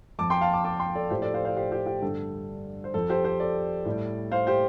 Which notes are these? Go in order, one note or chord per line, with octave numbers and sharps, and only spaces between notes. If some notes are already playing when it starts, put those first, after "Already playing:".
F2 F3 A5 D6
G5 C6
F5 A5
A5 D6
A5 D6
G5 C6
A4 D5
A2 F3 G4 C5
A4 D5
C5 F5
C5 F5
G4 C5
G4 C5
G4
G2 D3 G3 A4
C5
F2 F3 A4
G4 C5
G4 C5
A4 D5
A2 G3
C5 F5
G4 C5